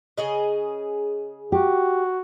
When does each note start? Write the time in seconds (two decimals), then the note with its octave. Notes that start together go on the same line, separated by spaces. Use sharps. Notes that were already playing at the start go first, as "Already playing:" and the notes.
0.17 C#3 G#4 D#5
1.52 F#4 G4